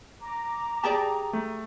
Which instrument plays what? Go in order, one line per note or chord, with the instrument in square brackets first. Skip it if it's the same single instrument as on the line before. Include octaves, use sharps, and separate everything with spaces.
[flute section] A#5 D6
[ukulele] G4 G#4 D5 [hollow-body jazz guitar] A5
[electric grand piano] A3